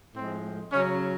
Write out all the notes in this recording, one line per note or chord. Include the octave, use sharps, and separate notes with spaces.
A2 F3 G#3 C4
C#3 F#3 C#4